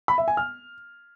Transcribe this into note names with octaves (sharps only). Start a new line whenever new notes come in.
B5
E5
G#5
F6